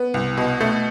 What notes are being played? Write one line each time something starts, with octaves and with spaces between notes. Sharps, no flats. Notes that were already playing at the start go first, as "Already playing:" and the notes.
Already playing: B3
C2
B2
A3